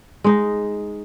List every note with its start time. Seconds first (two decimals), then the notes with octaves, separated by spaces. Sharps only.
0.24 G#3 D#4